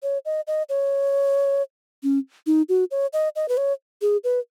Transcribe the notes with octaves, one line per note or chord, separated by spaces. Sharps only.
C#5
D#5
D#5
C#5
C#4
D#4
F#4
C#5
D#5
D#5
B4
C#5
G#4
B4